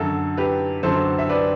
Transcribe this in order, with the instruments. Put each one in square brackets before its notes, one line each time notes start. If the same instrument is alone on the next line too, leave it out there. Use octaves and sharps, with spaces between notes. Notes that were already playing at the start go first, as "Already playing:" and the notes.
Already playing: [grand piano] F#2 D3 F#3 A4
G4 B4
F#2 D3 F#3 A4 C5
E5
B4 D5